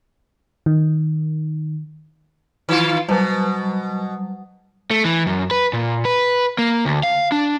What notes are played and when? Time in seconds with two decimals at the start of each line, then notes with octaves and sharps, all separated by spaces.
0.66 D#3
2.69 D#3 F4
3.09 B2 F#3 G3
4.91 A3
5.05 E3
5.27 F#2
5.51 B4
5.73 A#2
6.05 B4
6.58 A#3
6.85 D2
7.03 F5
7.32 D4